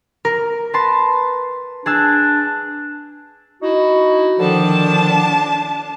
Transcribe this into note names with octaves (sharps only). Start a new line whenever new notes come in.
A#4
B4 A5 C6
D4 G#4 A5 E6
D#4 E4 F#4
D3 D#3 F3 D4 A5